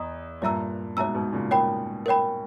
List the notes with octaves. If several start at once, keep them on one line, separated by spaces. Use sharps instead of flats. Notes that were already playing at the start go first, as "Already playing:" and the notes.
Already playing: E2 D#5 A#5 D#6
G2 A#2 C#5 E5 A#5 E6
G#2 B2 C#5 E5 A#5 E6
G#2 B2
A#2 C#3
A#4 C#5 G5 B5
A#4 C#5 G5 B5